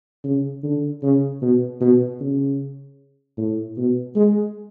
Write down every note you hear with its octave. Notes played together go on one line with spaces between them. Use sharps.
C#3
D3
C#3
B2
B2
C#3
A2
B2
G#3